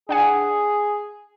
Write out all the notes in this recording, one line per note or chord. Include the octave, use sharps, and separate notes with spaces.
D4 G#4 F#5 G#5